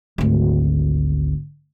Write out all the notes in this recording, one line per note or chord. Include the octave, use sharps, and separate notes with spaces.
G#1 D2